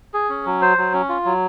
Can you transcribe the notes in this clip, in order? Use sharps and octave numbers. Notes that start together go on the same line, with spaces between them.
G#4
C#4
F#3
C5
F#3
C#4
F4
F#3